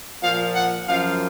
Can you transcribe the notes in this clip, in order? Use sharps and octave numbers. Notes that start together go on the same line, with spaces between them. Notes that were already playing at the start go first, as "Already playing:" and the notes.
A#2 F3 F5
F#5
F#2 F3 F5